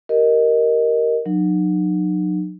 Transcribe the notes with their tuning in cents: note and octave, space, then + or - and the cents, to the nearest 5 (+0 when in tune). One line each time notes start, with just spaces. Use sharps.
G4 -15 A#4 +0 D#5 +0
F#3 -30 D#4 -40